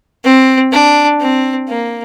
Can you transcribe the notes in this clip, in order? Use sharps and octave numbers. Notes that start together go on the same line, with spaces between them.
C4
D4
C4
A#3